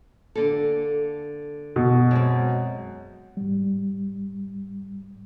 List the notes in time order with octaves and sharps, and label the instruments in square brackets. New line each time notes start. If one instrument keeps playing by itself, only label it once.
[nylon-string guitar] D3 A#3 A4
[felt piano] B2
[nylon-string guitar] F#2 G#3 C4
[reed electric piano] G#2 G3